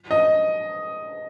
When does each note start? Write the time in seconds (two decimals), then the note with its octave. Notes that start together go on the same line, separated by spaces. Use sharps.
0.11 D#5